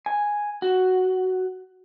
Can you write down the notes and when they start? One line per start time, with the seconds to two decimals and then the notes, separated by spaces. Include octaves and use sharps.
0.06 G#5
0.62 F#4